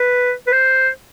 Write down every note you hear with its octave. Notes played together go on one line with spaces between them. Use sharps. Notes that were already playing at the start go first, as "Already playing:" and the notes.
Already playing: B4
B4
C5